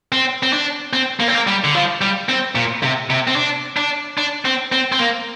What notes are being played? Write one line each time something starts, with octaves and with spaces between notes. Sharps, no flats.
C4
C4
D4
C4
A#3
C4
A#3
G3
D3
F3
G3
C4
A#2
C3
C3
C4
D4
D4
D4
C4
C4
C4
A#3